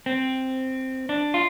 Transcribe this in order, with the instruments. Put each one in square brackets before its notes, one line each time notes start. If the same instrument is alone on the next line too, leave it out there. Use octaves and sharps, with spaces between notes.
[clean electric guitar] C4
D4
F4